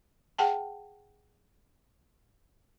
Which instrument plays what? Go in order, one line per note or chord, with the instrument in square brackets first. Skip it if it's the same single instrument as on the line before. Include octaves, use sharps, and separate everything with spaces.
[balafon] G#4 F#5 G5 A5